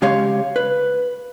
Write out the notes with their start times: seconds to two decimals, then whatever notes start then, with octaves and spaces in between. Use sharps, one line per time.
0.02 C#3 G#3 G4 C#5 F5
0.56 B4